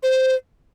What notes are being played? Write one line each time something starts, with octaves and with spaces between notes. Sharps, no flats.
C5